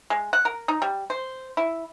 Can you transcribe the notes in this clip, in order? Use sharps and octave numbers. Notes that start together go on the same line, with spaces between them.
G#3
F#5
A#4
D#4
G3
C5
E4